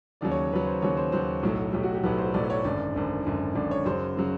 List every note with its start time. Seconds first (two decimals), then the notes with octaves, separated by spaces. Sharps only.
0.21 D#2 C#3 F#3 D5
0.31 C#5
0.52 D#2 C#3 F#3 B4
0.66 C5
0.82 D#2 C#3 F#3 C#5
0.97 C5
1.12 D#2 C#3 F#3 C5
1.43 B1 A2 F#3
1.73 B1 A2 F#3 G4
1.83 F#4
1.94 G4
2.04 B1 A2 F#3 B4
2.18 C5
2.34 B1 A2 F#3 D5
2.45 D5
2.50 C#5
2.64 G#1 F#2 D3 D5
2.94 G#1 F#2 D3
3.25 G#1 F#2 D3
3.55 G#1 F#2 D3 D5
3.71 C#5
3.85 F#2 C#3 F#3 C5
4.17 C#3 F#3